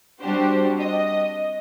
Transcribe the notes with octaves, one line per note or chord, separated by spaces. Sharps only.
G3 C4 D4 F#4 G4 C5
D#5